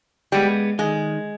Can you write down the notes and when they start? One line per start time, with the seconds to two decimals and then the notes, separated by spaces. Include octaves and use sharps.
0.32 G3 G#3 B3
0.79 D#3 G#3